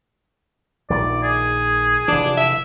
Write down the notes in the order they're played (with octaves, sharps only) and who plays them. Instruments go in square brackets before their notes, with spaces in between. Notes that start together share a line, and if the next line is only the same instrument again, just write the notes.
[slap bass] A#1 D#3 [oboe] D5
[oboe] G#4
[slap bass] F1 E3 [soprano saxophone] D4
[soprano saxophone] E5